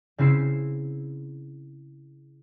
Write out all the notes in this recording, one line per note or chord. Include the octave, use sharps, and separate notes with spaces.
C#3 C4 E4 C7 E7